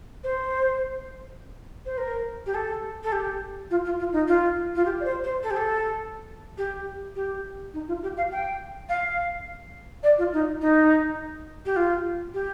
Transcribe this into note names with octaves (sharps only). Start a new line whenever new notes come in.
C5
C5
A#4
G4
A4
A4
G4
F4
F4
F4
D#4
F4
F4
G4
D5
C5
C5
A4
G4
A4
G4
G4
D#4
F4
G4
F5
G5
F5
D5
F4
D#4
D#4
G4
F4
G4